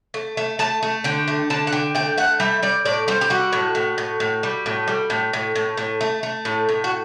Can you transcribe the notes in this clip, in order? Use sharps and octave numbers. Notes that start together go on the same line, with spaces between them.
A3
A3
A3 A5
A3
D3 G5
A3
D3 A5
F#5
D3 G5
A3 G5
A3 F#5
G3 E5
G3 D5
A2 D5
G3 C5
G4
G3 F#4
A2
A2
A2
A2
G3
A2
G3
A2
A2
A2
A2
A3
A3
A2
A2
F#4